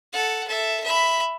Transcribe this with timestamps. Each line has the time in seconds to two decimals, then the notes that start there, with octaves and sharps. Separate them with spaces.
0.13 A4 F#5
0.48 A4 E5
0.84 E5 B5